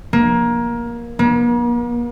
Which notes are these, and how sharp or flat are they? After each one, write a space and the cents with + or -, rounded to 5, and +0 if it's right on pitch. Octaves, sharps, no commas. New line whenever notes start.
A#3 +20
A#3 +45